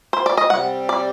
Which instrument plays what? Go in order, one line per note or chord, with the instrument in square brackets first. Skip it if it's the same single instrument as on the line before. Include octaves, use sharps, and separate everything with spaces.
[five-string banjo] C5
D5
D#5
[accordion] C3 G3 C4 [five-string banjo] F#5
[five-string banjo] D5